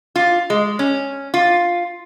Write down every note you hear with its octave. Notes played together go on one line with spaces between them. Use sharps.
F4
G#3
C#4
F4